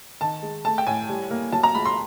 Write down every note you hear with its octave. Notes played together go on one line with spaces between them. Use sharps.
D#3 A5
G#3
A3 A5
G5
A2 G#5
G3
A#3
F#3 A5
A#5
C#2 B5
C6